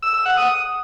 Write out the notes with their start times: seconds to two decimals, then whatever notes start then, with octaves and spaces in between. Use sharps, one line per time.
0.02 E6
0.14 E6
0.26 F#5
0.37 D#6